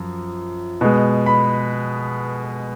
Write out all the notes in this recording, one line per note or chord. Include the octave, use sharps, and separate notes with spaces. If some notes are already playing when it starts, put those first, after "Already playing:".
Already playing: F#2 F3
B2 G#3
B5